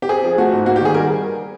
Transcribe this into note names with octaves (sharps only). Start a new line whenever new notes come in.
G4
C4 G#4
F3
A3 F#4
G#2
A#3 F#4
G4
D#3 G#4
G3 A#4